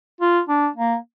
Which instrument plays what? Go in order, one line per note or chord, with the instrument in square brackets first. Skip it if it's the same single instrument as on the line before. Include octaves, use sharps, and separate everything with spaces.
[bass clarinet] F4
D4
A#3